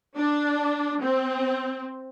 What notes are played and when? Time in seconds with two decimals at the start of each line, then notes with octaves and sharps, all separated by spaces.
0.16 D4
1.01 C4